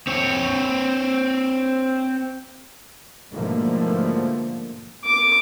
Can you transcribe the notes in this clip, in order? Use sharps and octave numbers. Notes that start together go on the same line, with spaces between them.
C4 C#5
G#2 B2 D3 F3 A3 A#3
D6